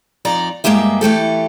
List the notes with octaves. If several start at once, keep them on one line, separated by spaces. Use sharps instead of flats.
F2 D#4 D5 A#5
G2 E3 G#3 A#3 G4 E5
E3 A3 G4 A4